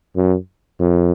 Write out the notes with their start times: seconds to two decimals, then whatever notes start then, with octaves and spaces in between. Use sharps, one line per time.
0.17 F#2
0.80 F2